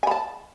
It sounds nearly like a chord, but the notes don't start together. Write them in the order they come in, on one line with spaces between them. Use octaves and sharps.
G#5 B5 A5